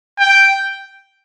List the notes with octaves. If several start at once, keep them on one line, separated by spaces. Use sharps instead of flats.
G5